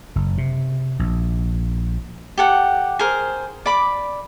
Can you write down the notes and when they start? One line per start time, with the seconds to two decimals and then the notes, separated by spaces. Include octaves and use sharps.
0.16 F#1
0.38 C3
0.99 A#1
2.38 G4 A4 F#5
2.99 G#4 A#4 C5
3.66 D5 B5 D6